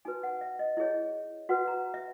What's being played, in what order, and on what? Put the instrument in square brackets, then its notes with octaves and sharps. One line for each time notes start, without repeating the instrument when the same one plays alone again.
[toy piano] D#4 F#4 B4 G#5
F#5
E5
D#5
E4 G#4 C#5 D#5
F#4 B4 F#5
A#5
E5